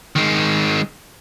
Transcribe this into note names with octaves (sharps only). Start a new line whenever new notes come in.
D#3 G#3